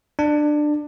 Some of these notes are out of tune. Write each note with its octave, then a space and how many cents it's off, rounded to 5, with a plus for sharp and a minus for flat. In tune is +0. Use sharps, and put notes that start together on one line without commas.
D4 +20